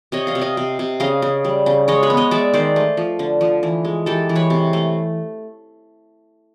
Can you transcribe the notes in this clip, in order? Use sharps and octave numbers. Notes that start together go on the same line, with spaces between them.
C3 C#5 D#5
D#5 F5
C3
D#5 F5
C3
C3
C#3 D#5 F5
C#3
G3
C#3
G#3 C#5 D#5
B4 C#5
B3
C#5 D#5
G#3 D5 E5
D#3 C5 D5
A3
F3
D3
F3
E3
G#3
E3 G4 A4
E3
B4 C#5
C3
A3